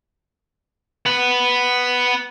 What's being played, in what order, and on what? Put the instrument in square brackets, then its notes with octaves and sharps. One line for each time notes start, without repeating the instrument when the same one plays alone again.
[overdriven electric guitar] B3 B4